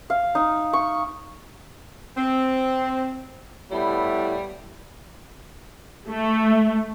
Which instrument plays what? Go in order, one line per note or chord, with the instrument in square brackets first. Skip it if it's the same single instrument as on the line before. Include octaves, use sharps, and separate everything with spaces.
[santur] F5
D#4
C#6
[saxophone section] C4
[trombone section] A2 B3 E4 [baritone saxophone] G3
[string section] A3